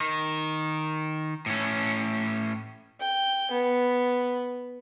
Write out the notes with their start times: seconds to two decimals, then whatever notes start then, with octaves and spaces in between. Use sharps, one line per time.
0.01 D#3
1.46 A2 C#4
3.00 G5
3.51 B3